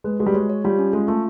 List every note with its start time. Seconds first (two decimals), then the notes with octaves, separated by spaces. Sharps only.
0.04 G#3 B4
0.19 G#3 F#4
0.26 G3
0.34 G#3 C#5
0.49 C#5
0.64 G3 F4
0.79 C#4
0.93 G#3 F4
1.08 A3 F4